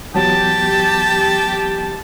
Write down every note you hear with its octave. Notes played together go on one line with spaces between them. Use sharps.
E3 F#3 B3 G4 A5